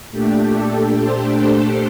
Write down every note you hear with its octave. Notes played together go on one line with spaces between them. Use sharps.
A#2 A3 D4 G4
A4
C5
C5